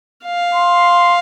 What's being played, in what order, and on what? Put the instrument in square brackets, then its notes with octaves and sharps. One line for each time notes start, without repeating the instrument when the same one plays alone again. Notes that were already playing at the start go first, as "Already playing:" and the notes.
[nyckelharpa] F5
[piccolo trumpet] C6